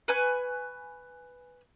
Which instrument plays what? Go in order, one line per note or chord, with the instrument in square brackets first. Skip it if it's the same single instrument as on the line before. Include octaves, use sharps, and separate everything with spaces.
[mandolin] B4 G#5 C#6 F#6